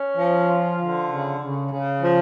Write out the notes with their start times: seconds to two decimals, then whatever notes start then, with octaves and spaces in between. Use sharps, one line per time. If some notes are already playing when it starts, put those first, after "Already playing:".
Already playing: C#4
0.17 F3
0.48 F4
0.79 D3
1.10 C#3
1.41 C#3
1.71 C#3
2.02 F3